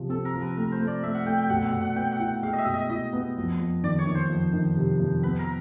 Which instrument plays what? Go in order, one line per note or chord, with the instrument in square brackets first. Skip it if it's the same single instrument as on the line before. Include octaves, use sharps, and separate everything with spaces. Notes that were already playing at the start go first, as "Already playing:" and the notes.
Already playing: [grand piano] C3 F3
[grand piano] C4 [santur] A4
[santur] A#4
[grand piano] F3
[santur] B4
[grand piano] A3 [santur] A#4
[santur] C5
[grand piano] A3
[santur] D5
[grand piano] A3 [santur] E5
[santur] F#5
[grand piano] A3 [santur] G5
[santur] G5
[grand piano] B2 [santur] F#5
[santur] F#5
[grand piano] B2
[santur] F#5
[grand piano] B3 [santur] G5
[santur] F#5
[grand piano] E4
[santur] G5
[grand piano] G#3 [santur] F5
[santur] D#5
E5
[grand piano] B2
[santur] D#5
[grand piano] E4 [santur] D#5
[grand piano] B3
F2
F2
[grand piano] D#3 [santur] D5
[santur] C#5
[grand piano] D#3
[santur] C5
[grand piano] F2
D#3
C3
F2
[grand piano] B3 [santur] B4
[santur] A#4